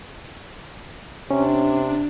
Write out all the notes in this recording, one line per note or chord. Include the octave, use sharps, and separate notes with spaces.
C3 C#4 D4